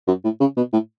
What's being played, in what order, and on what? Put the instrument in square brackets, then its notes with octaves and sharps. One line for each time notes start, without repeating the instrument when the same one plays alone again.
[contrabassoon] F#2
A2
C#3
B2
A2